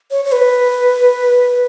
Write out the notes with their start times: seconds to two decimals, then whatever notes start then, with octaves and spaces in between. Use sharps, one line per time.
0.11 C#5
0.25 C#5
0.32 B4